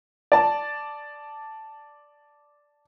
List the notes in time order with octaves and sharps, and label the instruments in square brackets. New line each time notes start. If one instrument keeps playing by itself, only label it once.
[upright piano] D5 A5